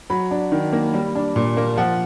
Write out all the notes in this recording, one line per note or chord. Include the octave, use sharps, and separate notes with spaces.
F#3 B5
D4
D#3
A#3
G3
D4
A#2
A#3
F3 F#5